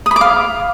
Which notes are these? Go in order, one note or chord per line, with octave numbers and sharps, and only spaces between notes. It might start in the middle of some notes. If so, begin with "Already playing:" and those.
D#6
B5
D6
F5